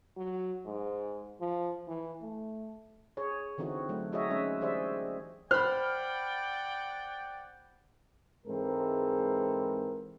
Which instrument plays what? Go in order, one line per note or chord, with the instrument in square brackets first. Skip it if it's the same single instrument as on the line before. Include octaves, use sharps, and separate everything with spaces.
[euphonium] F#3
G#2
F3
E3
A3
[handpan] G#4 C#5
D3 E3 C4 D#4 F#4
F#3 A3
D#4 F#4 G#4 C#5 D#5 E5
G#3 C#4 E5
E3 G4 G#4 C5 D5 E5
[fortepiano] C5 [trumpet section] D5 F#5 G5 [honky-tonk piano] B5 F6
[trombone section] G#2 E3 G#3 C4 A4 A#4